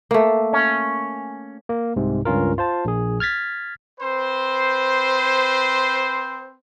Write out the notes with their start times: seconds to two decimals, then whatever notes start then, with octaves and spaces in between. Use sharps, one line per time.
0.11 A3 A#3
0.53 C#4
1.69 A#3
1.96 C2 G#2 C3
2.25 C#2 G2 C#4 F4 A#4
2.58 F4 C5 A5
2.85 A#1 G#4
3.20 F6 G#6 A6 B6
4.00 C4 B4 C5